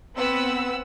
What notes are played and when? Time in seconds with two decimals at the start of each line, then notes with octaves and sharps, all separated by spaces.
0.16 B3 C4 B4 F#5 E6